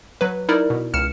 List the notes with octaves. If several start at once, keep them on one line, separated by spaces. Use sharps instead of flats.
F#3 B4
D#4 E4 A#4 D5
B2
C#2 F6 C#7 E7